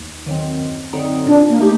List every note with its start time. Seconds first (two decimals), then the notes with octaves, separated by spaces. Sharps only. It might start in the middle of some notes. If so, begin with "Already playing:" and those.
Already playing: D#2
0.26 D#3 F#3 C4
0.60 F#2
0.93 D3 F#3 C4 D#4
1.26 A#2 D4
1.49 A#3
1.59 A3 D#4 G4